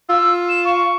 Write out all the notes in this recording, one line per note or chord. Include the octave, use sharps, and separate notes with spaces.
F4 E6
E7
C#6